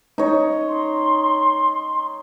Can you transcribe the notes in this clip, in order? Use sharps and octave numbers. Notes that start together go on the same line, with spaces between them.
D#4 C#5
C6